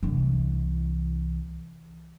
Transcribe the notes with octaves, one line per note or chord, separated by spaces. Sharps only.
C2 E3